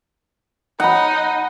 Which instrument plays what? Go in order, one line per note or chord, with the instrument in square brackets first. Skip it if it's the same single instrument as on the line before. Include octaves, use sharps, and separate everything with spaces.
[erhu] D#4 [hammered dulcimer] F#5 B5